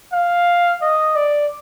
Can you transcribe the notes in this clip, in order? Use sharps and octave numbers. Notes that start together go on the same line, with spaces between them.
F5
D#5
D5